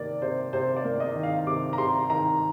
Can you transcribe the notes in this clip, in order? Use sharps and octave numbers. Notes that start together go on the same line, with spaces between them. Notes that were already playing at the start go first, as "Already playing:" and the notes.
Already playing: C3 D#3 A#3 D5
C3 C5
C3 C5
D5
A#3
D#5
D#3
F5
C3 D6
A#5
C3 C6
D#3 A#5